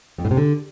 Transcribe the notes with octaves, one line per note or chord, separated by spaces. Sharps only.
F2
A2
C3
D3